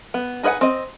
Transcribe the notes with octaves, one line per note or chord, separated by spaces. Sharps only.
B3
D#4 G#4 B4 E5 F#5
C4 D#5